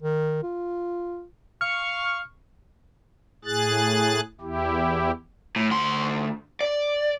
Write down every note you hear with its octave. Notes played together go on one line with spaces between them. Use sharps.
D#3
F4
F5 C#6 F6
A2 G#4 F#6 A6
E2 E4 G4
A2
D2 C6
D5